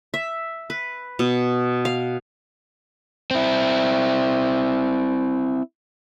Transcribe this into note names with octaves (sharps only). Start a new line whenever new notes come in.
E5
B4
B2
F5
C4 E4